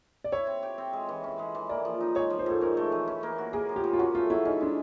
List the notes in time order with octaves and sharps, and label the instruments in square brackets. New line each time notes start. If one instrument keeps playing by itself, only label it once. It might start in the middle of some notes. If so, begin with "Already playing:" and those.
[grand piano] D5
[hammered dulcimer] E4 [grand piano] C#5
[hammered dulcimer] C4
G4
C4
G#3
E3
C#4
G#3
E3
[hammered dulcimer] A#3 [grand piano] D5
[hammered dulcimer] F3
D#4
[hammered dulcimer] G#3 [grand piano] C#5
[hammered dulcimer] F3
[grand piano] C5
[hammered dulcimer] G#2 [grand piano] A4
[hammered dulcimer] C#4 [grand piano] A#4
[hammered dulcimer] A3
E3
C#4
A#3
F#4
[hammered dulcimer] A#3 [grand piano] G#4
[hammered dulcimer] F3
[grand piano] G4
[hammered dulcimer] C#3
[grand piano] F4
[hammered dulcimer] C#4 [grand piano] F#4
[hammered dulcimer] A3 [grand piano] F4
[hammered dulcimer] F#3 [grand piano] E4
[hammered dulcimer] C#4 [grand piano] D#4
[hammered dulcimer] G#3 [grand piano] D4